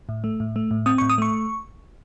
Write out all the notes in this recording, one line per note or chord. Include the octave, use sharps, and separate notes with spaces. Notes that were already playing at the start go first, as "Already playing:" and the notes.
A2
A3
A2
A3
A2
C4 D#6
C#6
A2
D#6
A3 C#6